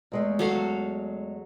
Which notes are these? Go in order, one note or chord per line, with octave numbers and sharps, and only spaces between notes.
E2 G#3 A3
F#3 A4 F5